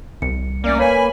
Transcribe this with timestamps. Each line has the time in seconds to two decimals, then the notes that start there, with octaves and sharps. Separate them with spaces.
0.22 C2 C#7
0.64 A3 A#3 C#4 D5
0.79 B4 C#5 G#5 B5 C7